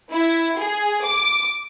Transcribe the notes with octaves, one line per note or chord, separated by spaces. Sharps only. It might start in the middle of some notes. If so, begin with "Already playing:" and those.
E4
G#4
D6